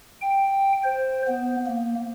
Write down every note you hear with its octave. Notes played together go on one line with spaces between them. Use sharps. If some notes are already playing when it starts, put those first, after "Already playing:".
G5
C5
B3
A#3